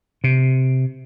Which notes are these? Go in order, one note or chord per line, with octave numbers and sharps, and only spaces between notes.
C3